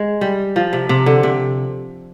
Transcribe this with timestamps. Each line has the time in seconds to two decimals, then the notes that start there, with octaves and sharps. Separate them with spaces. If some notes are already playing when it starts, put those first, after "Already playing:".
Already playing: G#3
0.21 G3
0.56 F3
0.73 C3
0.89 C3
1.06 D3
1.23 C3